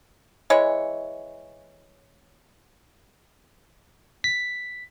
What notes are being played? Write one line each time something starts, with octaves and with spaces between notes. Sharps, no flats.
E3 G#3 C#5
B6